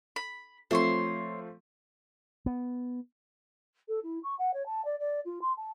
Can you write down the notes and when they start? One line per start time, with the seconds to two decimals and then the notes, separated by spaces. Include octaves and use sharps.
0.16 B5
0.71 F3 A3 C4 C5 C#5 C6
2.46 B3
3.88 A4
4.03 E4
4.23 C#6
4.39 F#5
4.54 C#5
4.66 A5
4.84 D5
4.99 D5
5.25 F4
5.41 C6
5.57 A5